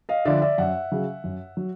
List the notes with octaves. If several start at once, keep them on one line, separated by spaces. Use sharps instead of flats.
D#5 F5
D3 F3 D5 E5
D5 E5
F#2 E5 F#5
C#3 F#3
F#2
F#3